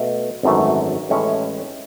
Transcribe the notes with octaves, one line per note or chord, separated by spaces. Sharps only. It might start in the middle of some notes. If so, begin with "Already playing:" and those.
Already playing: B2 A3
G#1 F#2 E3 A3
A1 A2 G#3 C#4 E4